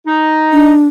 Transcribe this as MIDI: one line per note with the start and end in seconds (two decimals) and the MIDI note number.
0.06 0.71 63
0.52 0.88 62